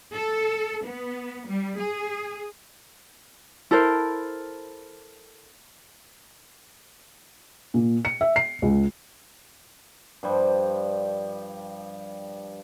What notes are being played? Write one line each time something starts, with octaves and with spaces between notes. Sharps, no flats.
A4
B3
G3
G#4
E4 A4 A#4 C5
A#2
C#7
E5
C7
C#2
G2 F3 G3